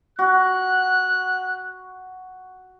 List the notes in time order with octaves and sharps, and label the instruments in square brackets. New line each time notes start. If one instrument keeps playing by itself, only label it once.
[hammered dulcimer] F#4 [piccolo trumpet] F#6